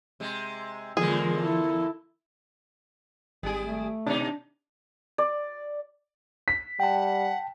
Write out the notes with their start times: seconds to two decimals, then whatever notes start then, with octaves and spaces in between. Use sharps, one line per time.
0.20 C3 G#3
0.97 E2 A#2 D3 F3 G#3 A#3 G#4
1.41 E4 A4
3.43 G#1 G3 G#4 D7
3.62 A3
4.06 B2 D4 D#4
5.18 D5
6.48 B6
6.80 G3 F#5 G5 A5